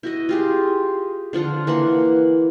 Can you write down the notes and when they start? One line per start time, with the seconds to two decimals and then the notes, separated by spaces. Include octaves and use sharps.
0.03 E4 F#4 D#5
0.29 F4 G4 G#4
1.33 D3 F3 F4 F#5
1.67 E3 A#3 F#5 C6